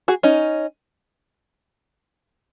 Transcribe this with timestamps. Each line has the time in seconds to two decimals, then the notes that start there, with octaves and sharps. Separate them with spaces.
0.08 F#4 G#4
0.23 C#4 D#4